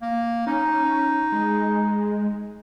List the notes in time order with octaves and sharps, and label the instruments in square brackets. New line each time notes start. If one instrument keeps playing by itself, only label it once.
[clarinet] A#3
[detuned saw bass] C#4 [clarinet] D#4
[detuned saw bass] G#3